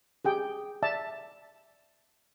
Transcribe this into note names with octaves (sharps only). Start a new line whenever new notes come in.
G4 G#4 G5
D5 E5 A5